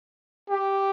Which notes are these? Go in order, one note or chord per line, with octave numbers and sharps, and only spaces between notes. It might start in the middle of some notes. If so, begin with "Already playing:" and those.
G4